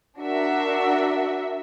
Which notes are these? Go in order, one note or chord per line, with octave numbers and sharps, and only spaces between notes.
D4 F#4 A#4 E5